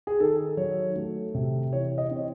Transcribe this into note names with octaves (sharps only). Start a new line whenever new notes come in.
G#4
D#3 A4
F#3 C#5
A3
C3
E3 C#5
D#5
C4 C#5